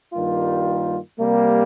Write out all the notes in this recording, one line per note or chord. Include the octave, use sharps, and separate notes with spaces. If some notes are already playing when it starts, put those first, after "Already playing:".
G2 D#3 G3 A#3 F4
C3 G3 A#3